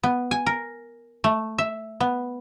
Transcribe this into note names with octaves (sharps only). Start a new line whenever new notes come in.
B3
G#5
A#4
A3
E5
B3